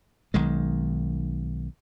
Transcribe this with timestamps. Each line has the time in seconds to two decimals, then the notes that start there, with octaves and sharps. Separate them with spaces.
0.34 B1 D#3 G#3